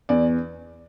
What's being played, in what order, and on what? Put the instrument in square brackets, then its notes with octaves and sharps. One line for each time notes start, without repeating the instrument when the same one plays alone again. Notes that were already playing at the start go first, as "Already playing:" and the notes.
[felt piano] E2 D5